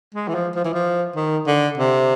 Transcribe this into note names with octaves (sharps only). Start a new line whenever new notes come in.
G#3
E3
F3
F3
E3
F3
D#3
D3
C3